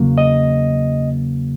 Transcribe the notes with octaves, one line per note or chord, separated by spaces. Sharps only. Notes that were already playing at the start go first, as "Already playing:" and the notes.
Already playing: E2 C#3 F#3 A#3
D#5